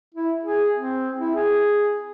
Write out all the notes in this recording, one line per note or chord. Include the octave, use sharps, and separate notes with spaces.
E4
G#4
C4
E4
G#4